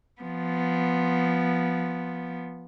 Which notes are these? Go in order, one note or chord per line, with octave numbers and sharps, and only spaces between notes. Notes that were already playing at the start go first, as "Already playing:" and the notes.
F3 B3